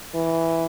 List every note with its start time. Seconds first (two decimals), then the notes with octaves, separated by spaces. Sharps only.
0.15 E3